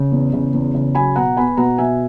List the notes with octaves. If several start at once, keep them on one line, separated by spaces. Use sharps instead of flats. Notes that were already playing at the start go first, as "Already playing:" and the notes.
Already playing: C#3
E2
C#3
E2
C#3
F#3 G#5 B5
B2 F#5 A#5
B3 G#5 B5
B2 F#5 A#5
B2 E5 G#5